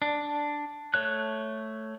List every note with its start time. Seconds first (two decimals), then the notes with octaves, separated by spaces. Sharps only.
0.02 D4
0.94 A3 C#5 F#6